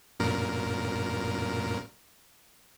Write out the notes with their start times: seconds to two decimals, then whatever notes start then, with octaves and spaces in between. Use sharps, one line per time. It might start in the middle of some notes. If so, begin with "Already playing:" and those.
0.20 F#2 A#2 A#4